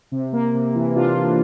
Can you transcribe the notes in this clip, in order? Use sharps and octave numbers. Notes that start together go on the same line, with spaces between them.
C3
A#3
C3
E3
C3 D4 F4
C3